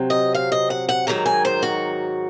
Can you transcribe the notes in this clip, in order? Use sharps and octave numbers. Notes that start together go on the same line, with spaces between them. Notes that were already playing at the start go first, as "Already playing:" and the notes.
Already playing: C3 F#3 C4
D#5
F5
D#5
F#5
F#5
G#2 D#3 F#3 A#5
G#5
C5
F#4